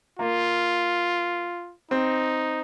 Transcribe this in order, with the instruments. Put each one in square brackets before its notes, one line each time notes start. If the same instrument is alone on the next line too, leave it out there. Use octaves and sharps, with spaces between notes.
[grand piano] A#3 [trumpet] F4
[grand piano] C4 [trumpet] D#4